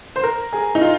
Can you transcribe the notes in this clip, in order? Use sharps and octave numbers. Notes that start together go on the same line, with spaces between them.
C5
A#4
G#4
D#4
F4